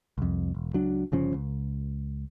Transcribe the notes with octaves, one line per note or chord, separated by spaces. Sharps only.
C2 F2
E1
C#2 F#3 D4
G1 C#3 F3 C#4
C#2